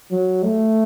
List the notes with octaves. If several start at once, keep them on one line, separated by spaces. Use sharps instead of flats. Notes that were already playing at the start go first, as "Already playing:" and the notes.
F#3
A3